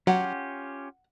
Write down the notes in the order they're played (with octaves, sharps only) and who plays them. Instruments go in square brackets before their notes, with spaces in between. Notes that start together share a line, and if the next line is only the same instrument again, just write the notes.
[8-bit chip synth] F#3 [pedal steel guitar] C#4 F4 G4 [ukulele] F#5